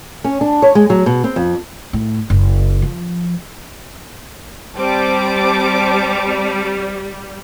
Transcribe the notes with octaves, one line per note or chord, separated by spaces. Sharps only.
C#4
D4
C#5
G#3
F#3
B2
C4
F2
A2
F#1
F3
G3 C4 A5 D6